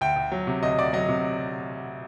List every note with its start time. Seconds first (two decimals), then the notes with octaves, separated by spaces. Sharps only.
0.01 D2 G5
0.16 D2
0.32 F#3
0.47 C3
0.63 D2 D#5
0.78 D2 D5
0.93 F#3 D#5
1.08 C3